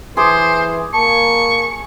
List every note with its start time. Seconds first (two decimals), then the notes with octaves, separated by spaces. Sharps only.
0.17 E3 G#4 C5 C6 D6 D#6
0.93 A#3 A5 C#6